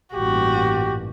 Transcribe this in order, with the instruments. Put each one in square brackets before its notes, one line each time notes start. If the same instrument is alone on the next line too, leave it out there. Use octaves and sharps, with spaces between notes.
[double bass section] A1 G2 A#2 [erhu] F#4 [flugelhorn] G4